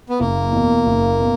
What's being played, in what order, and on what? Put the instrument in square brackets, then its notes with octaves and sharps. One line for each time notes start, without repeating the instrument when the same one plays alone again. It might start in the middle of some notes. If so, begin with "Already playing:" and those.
[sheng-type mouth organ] B3
[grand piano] F#1 [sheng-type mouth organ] A#3
[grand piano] E2 B2
F#1
B2